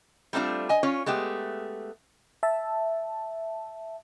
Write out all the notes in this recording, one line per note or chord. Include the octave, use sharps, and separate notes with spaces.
G3 A3 C4 D4 F4
D#5 G#5
C#4 F4 C#5
G#3 A3 B3 G4
E5 A5